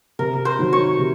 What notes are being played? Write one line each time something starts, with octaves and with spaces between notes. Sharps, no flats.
C3 A#4
C5
D#3 F#3 C4 F#4
C#5
C3